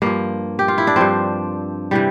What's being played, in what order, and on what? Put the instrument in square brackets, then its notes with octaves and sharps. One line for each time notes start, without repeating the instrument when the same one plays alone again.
[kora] G2 F3 A#3
G4
F4
E4
D4
G2 F3 C4
C3 E3 G3